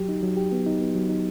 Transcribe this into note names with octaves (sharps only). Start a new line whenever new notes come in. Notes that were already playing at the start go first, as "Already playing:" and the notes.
Already playing: F#3 G4
D#4
F#3
G4
B3
D#4
B3
F#3
D#4